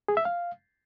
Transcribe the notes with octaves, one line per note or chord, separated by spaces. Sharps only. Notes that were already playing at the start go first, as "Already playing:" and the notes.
G#4
E5
F5